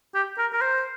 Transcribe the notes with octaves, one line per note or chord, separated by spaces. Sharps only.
G4
A#4
A#4
C5